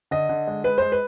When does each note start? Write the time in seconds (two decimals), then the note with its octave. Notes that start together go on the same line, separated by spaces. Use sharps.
0.11 D3 D#5
0.29 D3
0.47 G#3
0.64 G#3 B4
0.78 G#3 C5
0.92 B4